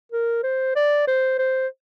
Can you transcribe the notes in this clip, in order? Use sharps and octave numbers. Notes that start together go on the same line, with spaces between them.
A#4
C5
D5
C5
C5